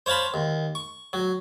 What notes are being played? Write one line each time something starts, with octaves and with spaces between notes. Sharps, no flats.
C5 C#5 F5 A5 B5
D#2
C#6
F#3